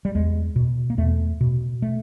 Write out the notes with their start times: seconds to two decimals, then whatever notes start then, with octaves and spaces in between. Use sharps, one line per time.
0.05 G3
0.15 E2 G#3
0.56 B2
0.90 A#3
0.98 E2 A3
1.41 B2
1.82 A3